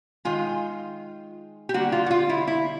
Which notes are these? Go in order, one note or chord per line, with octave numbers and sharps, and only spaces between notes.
D#3 G#3 F4
G4
D3 G3 A#3 F#4
F4
F#4
F4
E4
E4